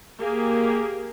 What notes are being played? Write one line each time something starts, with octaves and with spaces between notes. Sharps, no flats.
A#3 G4 G#4